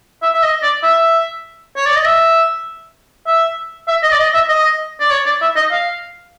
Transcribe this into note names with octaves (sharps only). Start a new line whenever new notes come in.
E5
E5
D#5
D5
E5
C#5
D5
D#5
E5
E5
E5
D#5
D5
D#5
E5
D#5
D5
C#5
D5
E5
D#5
F5